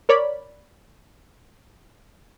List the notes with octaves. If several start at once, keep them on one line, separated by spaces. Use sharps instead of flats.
A#4 C#5 D5 B5